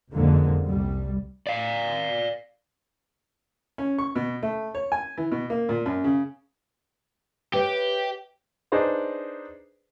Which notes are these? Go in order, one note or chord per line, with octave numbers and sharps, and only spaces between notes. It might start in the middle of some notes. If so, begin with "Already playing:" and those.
F#1 F2 G#2 D3 G#3 A#3
C2 G3
D5 F5
C#4
C#6
B2
A3
C#5
G#5
E3
B2
A#3
A#2
F#2
C#3
G4 B4 C#5 E5
D4 D#4 G#4 B4 C5 D5